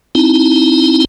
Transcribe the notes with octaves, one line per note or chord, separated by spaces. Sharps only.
C4 D#4 E4